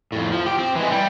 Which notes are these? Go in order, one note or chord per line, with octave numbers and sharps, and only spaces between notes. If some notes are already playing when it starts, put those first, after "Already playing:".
F2 A2
F3
G4
C4
E3 G#3
G3